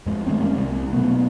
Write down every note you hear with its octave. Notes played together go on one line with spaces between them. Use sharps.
F2 G#3
D#3 G#3 A3 C4
G3 G#3 A#3 C#4
C2 C3
B2 F#3 A3 B3